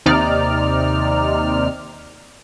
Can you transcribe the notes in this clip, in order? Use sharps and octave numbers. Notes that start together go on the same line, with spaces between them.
D#2 C3 D#4 D5 F6